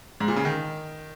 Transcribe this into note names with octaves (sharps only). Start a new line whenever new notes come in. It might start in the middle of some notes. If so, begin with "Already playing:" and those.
G#2
A#2
C#3
D#3